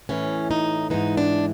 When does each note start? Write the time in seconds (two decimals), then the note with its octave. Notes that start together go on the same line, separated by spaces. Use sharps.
0.09 A2 E3 C#4
0.51 D#4
0.90 G#2 E3 D#4
1.17 D4